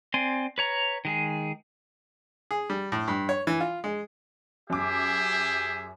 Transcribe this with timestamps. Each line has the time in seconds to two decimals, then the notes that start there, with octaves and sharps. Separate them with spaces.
0.14 C4 D5 G#5 C6
0.58 B4 C#5 A#5
1.05 D#3 G#3 G#4
2.51 G#4
2.70 G3
2.92 A2
3.08 G2
3.29 C#5
3.47 E3
3.60 F4
3.84 G#3
4.70 F#2 G4 G#4 E5 D6